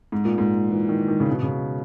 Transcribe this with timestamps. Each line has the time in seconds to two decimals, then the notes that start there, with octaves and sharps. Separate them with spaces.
0.12 G#2
0.25 A#2
0.38 G#2
0.70 E3
0.89 D#3
1.08 D#3
1.20 C#3
1.31 B2
1.43 C#3